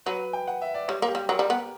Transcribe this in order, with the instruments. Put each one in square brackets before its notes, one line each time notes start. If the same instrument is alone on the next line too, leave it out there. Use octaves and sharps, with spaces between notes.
[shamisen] F#3 [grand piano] B4
[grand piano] G5
F#5
E5
D5
[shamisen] G3 [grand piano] C#5
[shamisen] A#3
[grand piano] G4
[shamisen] G3
[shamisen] F#3 [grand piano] A#4
[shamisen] G3
B3